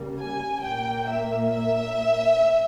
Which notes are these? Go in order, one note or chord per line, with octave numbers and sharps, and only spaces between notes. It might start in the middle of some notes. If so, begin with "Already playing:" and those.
Already playing: C#3 G3 A#3
G#5
A#2 A#3 G5
E5
E5